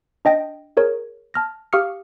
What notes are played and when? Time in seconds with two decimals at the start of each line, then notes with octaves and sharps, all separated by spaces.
0.25 D4 D#5 G5 A#6
0.77 G#4 A#4 C#5
1.34 A5 F6 A#6
1.73 G4 F5 C#6 D#6 F6 C#7